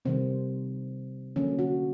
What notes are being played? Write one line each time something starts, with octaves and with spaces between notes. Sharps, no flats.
C3 D#3 G3 C4
D3 F#3 A#3 C#4
F#4